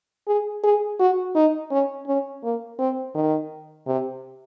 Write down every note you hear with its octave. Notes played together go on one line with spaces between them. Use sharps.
G#4
G#4
F#4
D#4
C#4
C#4
A#3
C4
D#3
C3